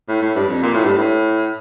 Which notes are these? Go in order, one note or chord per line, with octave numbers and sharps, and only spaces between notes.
A2
A2
G2
F2
A#2
A2
G2
A2